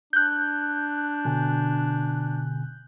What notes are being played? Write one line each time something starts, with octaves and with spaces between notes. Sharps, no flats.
D4 F#6 G6
B2 D3 G#5